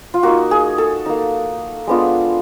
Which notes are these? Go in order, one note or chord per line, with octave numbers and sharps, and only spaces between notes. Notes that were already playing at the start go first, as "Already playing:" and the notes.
F4
A#3 D#4 F#4
G#4
A4
A#3 D#4
G#3 B3 D4 F4